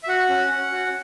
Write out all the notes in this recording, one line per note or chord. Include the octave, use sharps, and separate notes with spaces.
E5
F#4 F#5
C#4
C#4
F#4